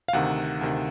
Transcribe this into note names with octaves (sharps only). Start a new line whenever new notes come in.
F5
D2 C3 D#3 F#5
D2 C3 D#3